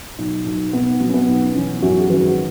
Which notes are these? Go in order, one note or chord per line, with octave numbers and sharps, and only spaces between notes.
B1
B1
B1 B3
F#3
C#4
B3
B1
E3 C#4
F#2 C#4 F#4
G#4
G#1 F#4 B4